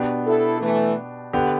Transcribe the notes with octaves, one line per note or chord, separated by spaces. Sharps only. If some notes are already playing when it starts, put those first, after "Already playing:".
Already playing: B2 B3 D4 G4
E4 A4
E3 A3
D3 B3 G4